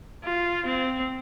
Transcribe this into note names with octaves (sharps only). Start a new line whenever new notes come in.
F4
C4